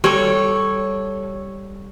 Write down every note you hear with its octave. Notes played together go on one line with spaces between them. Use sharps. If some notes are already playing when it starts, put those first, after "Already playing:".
G3 A4 C#5